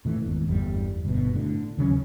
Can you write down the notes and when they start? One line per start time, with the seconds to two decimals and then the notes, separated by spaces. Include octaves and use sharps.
0.05 A#2 E3 A3
0.25 G#1 E2
0.48 G1 E2 G3
1.05 G1 B2
1.34 A2 D3
1.77 D#2 C#3 F#3 C#4